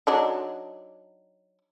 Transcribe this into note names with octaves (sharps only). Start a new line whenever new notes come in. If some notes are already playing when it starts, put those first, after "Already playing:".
F#3 D4 D#4